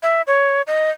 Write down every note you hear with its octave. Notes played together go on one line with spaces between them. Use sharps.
E5
C#5
D#5